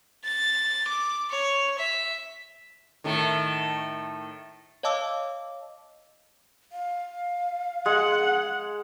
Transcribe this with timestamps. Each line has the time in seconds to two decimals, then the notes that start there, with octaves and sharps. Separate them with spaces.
0.25 A6
0.88 D6
1.31 C#5
1.79 E5
3.04 A2 D#3 A3
4.83 C#5 D#5 F5 A5 D6 E6
6.72 F5
7.86 G#3 F#5